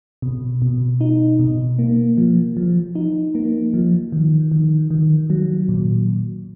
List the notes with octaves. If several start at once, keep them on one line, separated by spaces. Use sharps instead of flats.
B2
B2
D#4
B2
A#3
F3
F3
D#4
A#3
F3
D#3
D#3
D#3
F#3
A#2